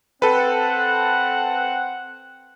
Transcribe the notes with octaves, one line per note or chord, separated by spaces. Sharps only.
C4 A4 B4 F#5